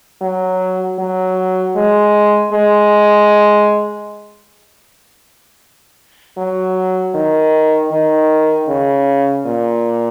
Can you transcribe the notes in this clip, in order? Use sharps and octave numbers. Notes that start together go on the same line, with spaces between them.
F#3
F#3
G#3
G#3
F#3
D#3
D#3
C#3
A#2